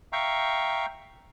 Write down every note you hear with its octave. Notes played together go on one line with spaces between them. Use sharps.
E5 F5 G5 A#5 C#6